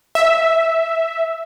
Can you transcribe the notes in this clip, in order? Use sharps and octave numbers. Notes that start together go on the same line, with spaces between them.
E5